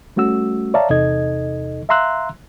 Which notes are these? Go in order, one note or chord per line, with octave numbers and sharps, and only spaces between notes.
G3 A3 C#4 F#4 E6
C#5 D5 E5 F5 A5 A#5
E2 C3 D#4 A4 D#5 G#6
E5 F5 A#5 C6 E6 F#6